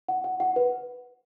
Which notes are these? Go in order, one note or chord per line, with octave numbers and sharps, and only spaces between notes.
F#5
F#5
F#5
B4